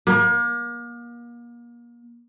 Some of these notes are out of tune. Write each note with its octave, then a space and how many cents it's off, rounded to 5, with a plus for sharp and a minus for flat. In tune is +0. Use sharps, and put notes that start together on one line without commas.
A#3 +35